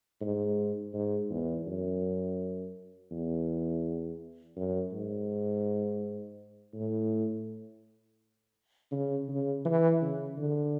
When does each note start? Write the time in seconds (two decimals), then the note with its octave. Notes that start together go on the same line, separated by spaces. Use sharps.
0.21 G#2
0.94 G#2
1.30 E2
1.67 F#2
3.11 E2
4.56 F#2
4.93 G#2
6.74 A2
8.92 C#3
9.29 C#3
9.65 E3
10.01 C#3
10.37 D3